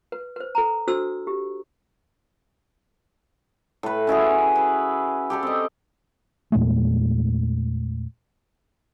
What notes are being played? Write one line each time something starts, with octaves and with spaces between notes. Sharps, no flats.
B4
B4 C5
A4 A#5
D4 F#4 A4 C5 E6
G4
A2 B4
C#4 E4 F#4 G#4
B4
G4 A4 D5
C4 D#5
E2 A#2 G#3 A3